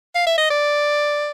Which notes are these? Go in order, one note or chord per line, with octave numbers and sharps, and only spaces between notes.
F5
E5
D#5
D5